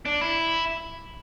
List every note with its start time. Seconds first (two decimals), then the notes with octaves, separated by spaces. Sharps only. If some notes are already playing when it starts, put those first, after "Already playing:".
0.05 D4
0.21 E4